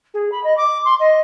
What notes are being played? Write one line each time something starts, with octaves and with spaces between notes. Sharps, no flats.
G#4
B5
D#5
D6
C6
D#5